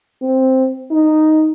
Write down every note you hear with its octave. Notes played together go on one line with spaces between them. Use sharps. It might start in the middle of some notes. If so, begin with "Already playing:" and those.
C4
D#4